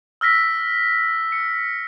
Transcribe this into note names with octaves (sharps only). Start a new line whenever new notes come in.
E6 F6 A#6 B6
C#7